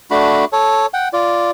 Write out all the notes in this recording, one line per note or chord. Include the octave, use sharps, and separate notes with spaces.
A3 D4 F#4 B5
A4 C#5
F#5 G5
F4 D5